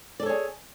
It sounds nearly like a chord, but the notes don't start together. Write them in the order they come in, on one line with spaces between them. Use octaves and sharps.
D5 A4 C#5 G#4